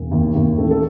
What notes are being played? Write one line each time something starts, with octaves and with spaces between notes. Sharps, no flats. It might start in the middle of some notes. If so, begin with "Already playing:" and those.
Already playing: E1
D#2
D#2
A1 A4
A4